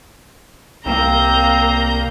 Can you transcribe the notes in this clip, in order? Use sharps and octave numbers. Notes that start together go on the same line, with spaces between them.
C2 A#3 C4 A#5 G6